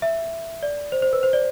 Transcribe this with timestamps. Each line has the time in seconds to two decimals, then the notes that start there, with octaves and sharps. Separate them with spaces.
0.02 E5
0.63 D5
0.92 C5
1.02 C5
1.13 B4
1.23 C5
1.33 D5